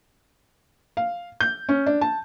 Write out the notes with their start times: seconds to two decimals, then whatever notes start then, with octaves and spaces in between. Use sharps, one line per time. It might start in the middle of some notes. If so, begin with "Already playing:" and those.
0.97 F5
1.40 G6
1.69 C#4
1.86 D4
2.01 A5